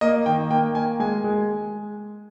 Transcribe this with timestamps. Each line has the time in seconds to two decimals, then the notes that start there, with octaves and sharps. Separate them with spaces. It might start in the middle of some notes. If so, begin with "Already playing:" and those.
0.01 A#3 D#5
0.26 D#3 G5
0.50 A#3 G5
0.75 A#3 G#5
1.00 G#3 G#5
1.24 G#3